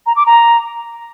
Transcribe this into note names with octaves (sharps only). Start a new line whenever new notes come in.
A#5
D6
A#5